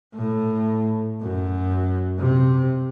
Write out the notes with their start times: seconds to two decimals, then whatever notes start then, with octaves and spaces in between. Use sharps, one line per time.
0.15 A2
1.21 F#2
2.19 C3